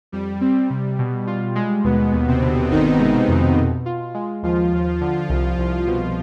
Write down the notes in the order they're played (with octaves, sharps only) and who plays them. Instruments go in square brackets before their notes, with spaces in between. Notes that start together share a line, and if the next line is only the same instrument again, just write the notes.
[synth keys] F2 [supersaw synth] G3
[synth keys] C4
C3
B2
F4
G#3
[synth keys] D#2 [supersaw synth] B2 B3
[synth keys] D#2
[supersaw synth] C3 C4
[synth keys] D3
[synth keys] G1 [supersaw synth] D#3 D#4
[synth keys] G#3
F2
B2
F4
G#3
[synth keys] D#2 [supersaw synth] F3 F4
[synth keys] D#2
D3
C2
C2
B2